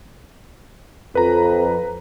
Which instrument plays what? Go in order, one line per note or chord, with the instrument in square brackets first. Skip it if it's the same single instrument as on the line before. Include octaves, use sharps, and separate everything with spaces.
[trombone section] F2 [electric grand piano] B4 A#5